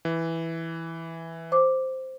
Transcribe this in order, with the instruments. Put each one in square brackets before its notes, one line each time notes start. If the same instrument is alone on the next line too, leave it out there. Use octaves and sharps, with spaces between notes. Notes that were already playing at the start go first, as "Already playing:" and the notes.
[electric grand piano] E3
[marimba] C5 D6